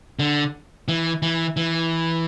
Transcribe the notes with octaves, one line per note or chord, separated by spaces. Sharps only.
D3
E3
E3
E3